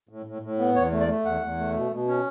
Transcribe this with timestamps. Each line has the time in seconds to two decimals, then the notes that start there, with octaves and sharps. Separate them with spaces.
0.09 A2
0.26 A2
0.42 A2
0.59 B3
0.76 E2 C#5
0.91 A3
1.00 D5
1.08 A3
1.25 E2 F#5
1.41 E2
1.58 A3
1.75 B2
1.91 B2
2.07 C#4